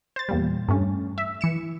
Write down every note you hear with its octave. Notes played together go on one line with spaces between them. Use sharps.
C5 A6
E2 A#2 G3
G2 A3 C#4
E5
E3 C#7 E7